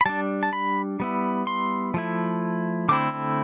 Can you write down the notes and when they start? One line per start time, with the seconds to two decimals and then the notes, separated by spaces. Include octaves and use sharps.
0.01 B5
0.06 G3 D4 A5
0.43 A5
0.53 B5
1.00 G3 B3 E4
1.47 C6
1.94 F3 A3 E4
2.89 D3 A3 C4 E4 D6